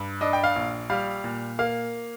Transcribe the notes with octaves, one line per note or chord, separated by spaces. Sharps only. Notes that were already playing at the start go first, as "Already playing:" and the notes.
Already playing: G2
D4 D#5
G5
F5
A#1
G3 F5
A#2
A#3 F5